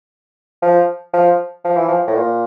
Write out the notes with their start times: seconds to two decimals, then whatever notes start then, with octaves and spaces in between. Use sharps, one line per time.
0.62 F3
1.13 F3
1.64 F3
1.76 E3
1.88 F3
2.07 A2
2.15 A#2